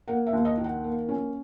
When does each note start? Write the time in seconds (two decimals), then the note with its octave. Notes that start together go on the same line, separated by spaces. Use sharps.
0.08 A#3 F#5
0.26 E5
0.33 D#2
0.45 D#5
0.58 D#3
0.64 F#5
0.84 A#3
1.09 C#4